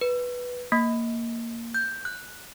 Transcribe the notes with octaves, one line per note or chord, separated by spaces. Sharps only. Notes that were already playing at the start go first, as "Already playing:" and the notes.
B4
A#3
G6
F#6